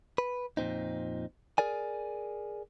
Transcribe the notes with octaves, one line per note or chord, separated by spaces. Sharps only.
B4
F2 A#2 C4 D#4
G#4 A#4 D5 G#5